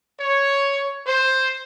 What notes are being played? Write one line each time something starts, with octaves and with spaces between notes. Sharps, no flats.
C#5
C5